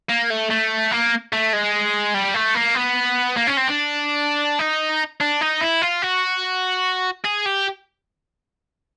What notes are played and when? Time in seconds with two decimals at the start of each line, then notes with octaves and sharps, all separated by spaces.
0.09 A#3
0.30 A3
0.51 A3
0.92 A#3
1.33 A3
1.53 G#3
2.14 G3
2.34 A3
2.55 A#3
2.75 B3
3.37 A#3
3.47 C#4
3.57 C4
3.68 D4
4.59 D#4
5.21 D4
5.41 D#4
5.61 E4
5.82 F4
6.02 F#4
7.25 G#4
7.46 G4